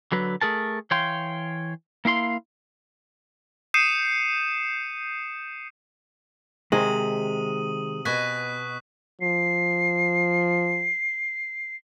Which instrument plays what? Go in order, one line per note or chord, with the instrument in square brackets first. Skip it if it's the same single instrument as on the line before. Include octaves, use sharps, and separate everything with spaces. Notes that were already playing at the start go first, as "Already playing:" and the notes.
[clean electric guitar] D3 F#3 B4
A3 G#4 A#4 A5
E3 C#5 F5 G5 C6
A#3 E4 F5 C6
[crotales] D#6 G6 C7 C#7 D#7 E7
[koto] C3 [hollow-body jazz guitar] D#3 G#3 [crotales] D#6 D#7 F#7
[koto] B2 G#5 [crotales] C#6 F#6 B6
[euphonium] F3 [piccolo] C7